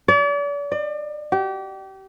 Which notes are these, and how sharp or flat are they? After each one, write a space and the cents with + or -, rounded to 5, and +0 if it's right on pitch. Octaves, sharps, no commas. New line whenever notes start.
D5 -40
D5 +35
G4 -30